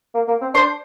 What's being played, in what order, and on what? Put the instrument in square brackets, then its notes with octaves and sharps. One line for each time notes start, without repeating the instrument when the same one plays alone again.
[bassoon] A#3
A#3
C4
[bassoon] D4 [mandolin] C5 C6